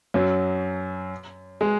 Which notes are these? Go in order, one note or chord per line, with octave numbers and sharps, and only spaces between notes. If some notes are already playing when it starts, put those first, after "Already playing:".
F#2 F#3
G#3